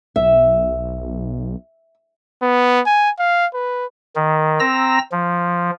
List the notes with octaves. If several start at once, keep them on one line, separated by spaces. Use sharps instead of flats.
B1 E5
B3
G#5
F5
B4
D#3
C4 A#5 E6 A#6
F3